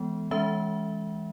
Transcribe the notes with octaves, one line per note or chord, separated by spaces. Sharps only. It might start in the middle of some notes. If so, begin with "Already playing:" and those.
Already playing: E3 G#3 B3
E3 G#3 C#4 E5